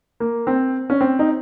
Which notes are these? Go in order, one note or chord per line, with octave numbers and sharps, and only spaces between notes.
A#3
C4
C#4
C4
D#4